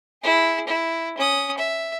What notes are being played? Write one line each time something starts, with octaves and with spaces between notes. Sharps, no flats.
E4 G#4
E4
C#4 D#6
E5